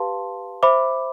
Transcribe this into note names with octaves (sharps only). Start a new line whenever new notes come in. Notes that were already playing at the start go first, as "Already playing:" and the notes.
Already playing: G4 B4 F5 A5 C6
C5 E5 B5 D6